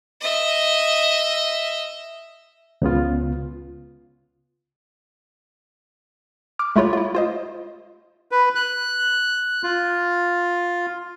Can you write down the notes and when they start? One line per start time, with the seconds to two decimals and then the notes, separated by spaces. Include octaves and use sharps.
0.21 D#5 E5
2.82 C#2 C#3 B3 F4
6.59 D6 F6
6.76 G#3 A3 E4 F4 C#5
6.93 E4 F4
7.15 F4 C5 D#5
8.31 B4
8.55 F#6
9.63 F4